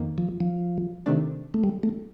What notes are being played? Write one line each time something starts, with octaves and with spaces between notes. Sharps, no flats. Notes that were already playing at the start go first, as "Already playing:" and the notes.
Already playing: F2 D#3 A#3
F3
F3
C3 D#3 A3 D4
A3
G3
A3